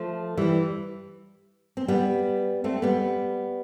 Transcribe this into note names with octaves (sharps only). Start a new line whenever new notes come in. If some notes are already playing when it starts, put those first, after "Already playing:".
Already playing: F3 A3
E3 G3
C4
G3 B3
A3 C4
G3 B3